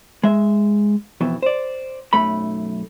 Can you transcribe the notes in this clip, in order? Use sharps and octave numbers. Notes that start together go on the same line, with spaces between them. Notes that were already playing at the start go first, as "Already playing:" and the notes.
G#3 E5
F2 B2 E3
C5 D5
B1 F#2 A3 B5